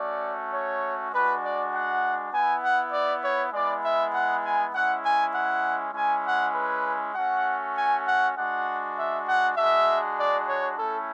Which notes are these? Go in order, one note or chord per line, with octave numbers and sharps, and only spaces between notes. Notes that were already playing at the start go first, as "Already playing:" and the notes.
Already playing: A3 C#4 F#4 D5
C#5
G#3 D4 F#4 B4
D5
F#5
B3 E4 G#5
F#5
D5
C#5
G#3 B3 E4 D5
E5
F#5
G#5
G#3 C#4 E4 F#5
G#5
F#5
G#3 C#4 E4 G#5
F#5
B4
A3 C#4 F#4 F#5
G#5
F#5
G#3 D4 F#4 F#5
E5
F#5
G#3 D4 F#4 E5
D5
C#5
A3 C#4 E4 A4